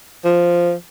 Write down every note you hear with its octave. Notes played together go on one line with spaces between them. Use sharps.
F3